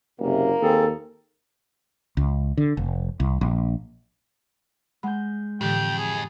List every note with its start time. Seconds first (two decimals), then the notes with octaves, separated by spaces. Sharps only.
0.20 F#1 C3 A#3
0.62 D#2 C4 G#4 A4
2.17 C#2
2.58 D3
2.77 F1
3.20 C2
3.41 A#1
5.03 G#3 F#5 B5 G6
5.61 F2 A2 D3 E3 G4 G5
5.98 G#4